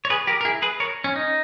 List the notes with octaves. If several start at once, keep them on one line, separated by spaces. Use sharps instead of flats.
C#5
G#4 B4
G4 A#4
A#4
E4 G#4
G#4 B4
A#4 C#5
C#4
D#4